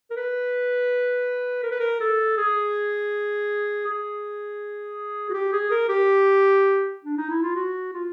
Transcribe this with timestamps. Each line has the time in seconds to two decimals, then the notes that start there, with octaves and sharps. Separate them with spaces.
0.11 A#4
0.16 B4
1.63 A#4
1.72 B4
1.80 A#4
2.00 A4
2.37 G#4
3.86 G#4
5.30 F#4
5.34 G4
5.53 G#4
5.71 A#4
5.89 G4
7.04 D4
7.18 D#4
7.30 E4
7.43 F4
7.55 F#4
7.94 F4